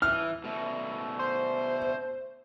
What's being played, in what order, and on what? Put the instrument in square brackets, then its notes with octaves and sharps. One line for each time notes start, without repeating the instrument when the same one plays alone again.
[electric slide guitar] E3 [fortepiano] F6
[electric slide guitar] B2 A3
[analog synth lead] C5